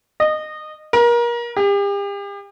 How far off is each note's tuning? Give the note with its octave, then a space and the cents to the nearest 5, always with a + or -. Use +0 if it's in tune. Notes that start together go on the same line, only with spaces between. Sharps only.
D#5 -20
A#4 +30
G4 +40